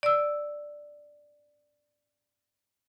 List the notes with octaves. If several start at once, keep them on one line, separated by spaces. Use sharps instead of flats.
D5 E6